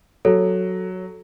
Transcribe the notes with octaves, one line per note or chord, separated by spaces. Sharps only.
F#3 A4